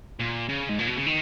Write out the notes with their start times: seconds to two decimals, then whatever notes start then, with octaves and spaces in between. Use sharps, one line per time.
0.20 A#2
0.49 C#3
0.69 G#2
0.79 A#2
0.88 B2
0.97 C#3
1.07 D#3